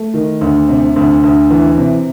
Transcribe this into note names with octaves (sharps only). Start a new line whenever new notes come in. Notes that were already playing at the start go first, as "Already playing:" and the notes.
Already playing: A3
D#3
D2
C3
D2
D2
E3
C3